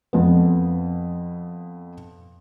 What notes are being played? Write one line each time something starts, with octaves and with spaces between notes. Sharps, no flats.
F2 B3